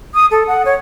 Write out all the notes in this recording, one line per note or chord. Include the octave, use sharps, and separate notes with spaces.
D#6
A4
F#5
C#5